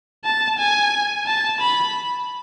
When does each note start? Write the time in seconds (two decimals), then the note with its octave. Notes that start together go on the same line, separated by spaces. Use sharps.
0.25 A5
0.59 G#5
1.26 A5
1.61 B5